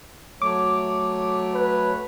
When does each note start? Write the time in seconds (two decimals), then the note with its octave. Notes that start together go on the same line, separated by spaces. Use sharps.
0.42 F#3 A3 C#5 D6
1.54 B4